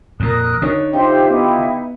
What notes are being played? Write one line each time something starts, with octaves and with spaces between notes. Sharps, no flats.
F2 A#2 A#4 D#6 F#6
D3 D#4 C#5
D#4 F4 G4 C5 E5
B3 D#4 E4 E5